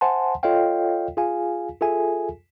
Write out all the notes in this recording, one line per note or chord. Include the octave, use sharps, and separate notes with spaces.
C5 E5 F#5 G#5 A5 C6
F4 A4 C#5 D#5 F5 G5
F4 G#4 F5 G#5
F4 G#4 A4 E5 G#5